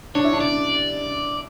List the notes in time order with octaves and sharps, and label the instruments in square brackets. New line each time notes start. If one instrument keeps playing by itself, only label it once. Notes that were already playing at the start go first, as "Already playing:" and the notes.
[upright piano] D4 [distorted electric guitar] C#5
[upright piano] E4
D4
[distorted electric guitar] D5